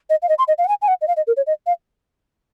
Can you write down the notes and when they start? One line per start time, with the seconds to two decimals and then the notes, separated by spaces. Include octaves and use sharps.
0.10 D#5
0.22 F5
0.29 D#5
0.38 C6
0.48 D#5
0.58 F5
0.64 F#5
0.68 G#5
0.82 G#5
0.88 F#5
1.01 D#5
1.08 F5
1.17 D#5
1.27 A#4
1.37 C#5
1.47 D#5
1.66 F5